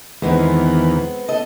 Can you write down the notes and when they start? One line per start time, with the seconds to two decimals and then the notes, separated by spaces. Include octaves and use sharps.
0.22 E2 D#3 E3 G#3 B3 C4
1.29 A4 D#5